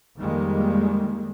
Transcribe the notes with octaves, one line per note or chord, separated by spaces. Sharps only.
F2 D#3 G3 G#3 A#3